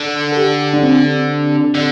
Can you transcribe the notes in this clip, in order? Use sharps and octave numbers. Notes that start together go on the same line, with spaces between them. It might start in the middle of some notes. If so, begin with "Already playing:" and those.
Already playing: D3 A4
A4
G4
D4
C4
D3